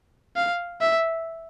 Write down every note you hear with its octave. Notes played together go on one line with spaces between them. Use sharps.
F5
E5